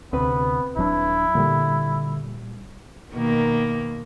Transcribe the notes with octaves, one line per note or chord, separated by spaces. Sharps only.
D2 C3 B3 C4 B4
D#1 F#3 D4 E4
A#2 D3 G3
B2 D#3 A#3